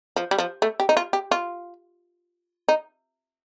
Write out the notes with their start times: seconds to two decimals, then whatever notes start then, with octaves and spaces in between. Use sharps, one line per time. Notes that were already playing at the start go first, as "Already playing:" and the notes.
0.16 F3
0.31 G3
0.38 F3
0.62 A3
0.80 G4
0.89 D#4
0.97 F4
1.13 G4
1.31 F4
2.68 D#4